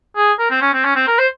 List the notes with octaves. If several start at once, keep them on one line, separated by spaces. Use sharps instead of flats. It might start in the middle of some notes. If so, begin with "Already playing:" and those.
G#4
A#4
C4
C#4
C4
C#4
C4
A#4
C5